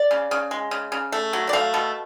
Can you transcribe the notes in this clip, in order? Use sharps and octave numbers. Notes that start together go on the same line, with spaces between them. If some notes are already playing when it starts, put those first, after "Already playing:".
Already playing: D5
C#3
C#3
G#3
C#3
C#3
A3
F#3
D5
A3 F5
B2